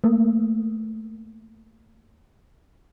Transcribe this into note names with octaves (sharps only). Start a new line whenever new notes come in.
A3 A#3